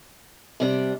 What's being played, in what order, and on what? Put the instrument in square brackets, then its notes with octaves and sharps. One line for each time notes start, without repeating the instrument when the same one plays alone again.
[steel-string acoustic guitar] C3 G3 D4